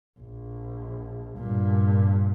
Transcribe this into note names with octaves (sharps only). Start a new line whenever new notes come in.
A#1
G2 A#2